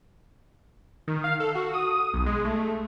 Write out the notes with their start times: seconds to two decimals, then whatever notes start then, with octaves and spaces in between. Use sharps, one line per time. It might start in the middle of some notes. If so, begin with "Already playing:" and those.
1.08 D#3
1.24 F5
1.40 A4
1.55 F#4
1.73 D#6
2.14 B1
2.26 G#3
2.45 A3